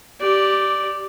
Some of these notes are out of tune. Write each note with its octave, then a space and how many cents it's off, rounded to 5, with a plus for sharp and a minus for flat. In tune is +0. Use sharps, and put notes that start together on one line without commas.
G4 -15 D5 +0